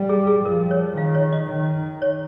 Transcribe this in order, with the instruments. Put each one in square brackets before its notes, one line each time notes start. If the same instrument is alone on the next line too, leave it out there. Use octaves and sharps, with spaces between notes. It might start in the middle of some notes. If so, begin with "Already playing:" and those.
Already playing: [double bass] G3
[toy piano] G#4
G#4
[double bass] F3 [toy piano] A#4
[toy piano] C#5
[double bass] D#3 [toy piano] F5
[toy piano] C#5
D#5
[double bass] D#3
[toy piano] C#5